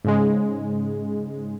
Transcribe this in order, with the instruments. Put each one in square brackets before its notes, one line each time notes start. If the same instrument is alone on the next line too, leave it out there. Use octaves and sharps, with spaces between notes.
[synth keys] G#2 C#3 G#3